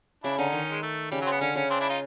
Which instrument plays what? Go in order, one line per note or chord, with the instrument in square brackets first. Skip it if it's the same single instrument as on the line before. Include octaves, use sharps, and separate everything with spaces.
[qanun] C#3 [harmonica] D4 E4
[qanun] D3 [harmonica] C#4 D#4
[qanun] D#3
[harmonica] G#3
A3
[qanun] C#3 [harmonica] G3
[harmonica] F#3
C4
B3
[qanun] D3 [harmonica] C#4
[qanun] C#3 [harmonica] C#4
[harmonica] C4 D4
D4 E4
D#4 F4